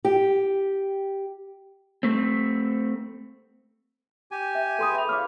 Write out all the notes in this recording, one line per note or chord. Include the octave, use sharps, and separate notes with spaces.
G4
A3 C4
G4 G#5
E5
E4 G#4 A4 B4 C6 D#6
E5 F7
C#5 E5 F5 D6 F6